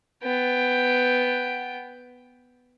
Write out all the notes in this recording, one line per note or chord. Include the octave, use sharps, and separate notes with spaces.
B3 G5